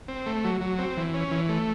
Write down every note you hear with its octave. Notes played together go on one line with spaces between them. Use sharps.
C4
A3
F#3
F#3
C4
E3
C#4
E3
A3